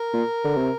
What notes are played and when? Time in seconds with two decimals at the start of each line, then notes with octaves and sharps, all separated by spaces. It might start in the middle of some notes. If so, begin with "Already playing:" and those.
Already playing: A#4
0.13 A#2
0.44 D3
0.57 C3